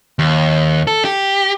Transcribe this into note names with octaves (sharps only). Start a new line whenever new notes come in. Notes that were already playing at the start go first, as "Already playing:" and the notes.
D#2
A4
G4